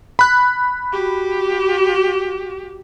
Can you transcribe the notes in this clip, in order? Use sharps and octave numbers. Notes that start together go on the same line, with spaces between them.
B5 F#6
F#4 G4